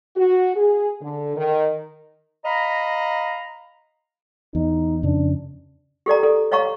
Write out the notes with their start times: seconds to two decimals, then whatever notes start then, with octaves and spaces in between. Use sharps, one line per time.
0.16 F#4
0.56 G#4
1.01 D3
1.37 D#3
2.45 D#5 F5 A#5 B5
4.55 E2 D#4
5.03 F2 C#3 C#4 D4
6.06 G4 A4 D5 A#5
6.23 A4
6.52 C#5 D#5 F5 A#5 C#6